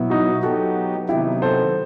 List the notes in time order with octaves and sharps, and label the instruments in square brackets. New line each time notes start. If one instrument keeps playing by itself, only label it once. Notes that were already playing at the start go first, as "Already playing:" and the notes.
Already playing: [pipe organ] B2 F#3 B3 E4
[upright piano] D#4 F#4
[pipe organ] F#3 B3 D#4 G4 [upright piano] F#4 A4
[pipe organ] C3 D#3 F#3 B3 D#4 [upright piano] E4 G4
[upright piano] A4 C5